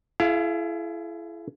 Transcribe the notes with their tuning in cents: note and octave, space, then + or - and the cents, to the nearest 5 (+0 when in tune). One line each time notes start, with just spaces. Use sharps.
E4 +30 G#4 +40 F5 +0